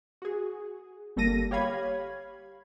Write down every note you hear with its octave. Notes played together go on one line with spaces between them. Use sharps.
F#4 G#4
G1 G3 A#3 A4 A#6 D#7
G4 C#5 F5 B5 G#6